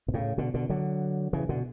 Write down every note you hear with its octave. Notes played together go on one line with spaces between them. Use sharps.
B2
A2 C#3
B2 D3
B2 D3
D3 F#3
C#3 E3
B2 D3